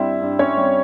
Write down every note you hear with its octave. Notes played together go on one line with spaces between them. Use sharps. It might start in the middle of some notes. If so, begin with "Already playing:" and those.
Already playing: G2 G3 C4 E4 E5
G2
C#4 C#5
G3 C4